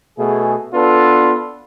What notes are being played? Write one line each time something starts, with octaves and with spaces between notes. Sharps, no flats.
B2 A3 G#4
B3 D4 F4 A4 B4